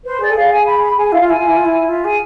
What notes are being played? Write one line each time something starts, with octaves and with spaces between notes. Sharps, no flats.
B4 C5
G#4 D5
A4 G#5
G#4 F5
G#5
B5
B5
G#4 G#5
E4 F5
F4
E4 G#5
F4
E4
F4
E4
F4 E5
G#4 G#5